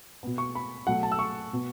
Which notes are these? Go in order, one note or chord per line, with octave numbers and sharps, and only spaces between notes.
B2 B3
C#6
B5
B2 F#3 A3 F#5
A5
E6
C#6
B2 B3